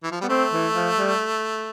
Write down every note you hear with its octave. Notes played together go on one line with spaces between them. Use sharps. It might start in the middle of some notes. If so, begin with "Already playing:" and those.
E3
F3
G3 B3
A3 C4
E3
F3
G3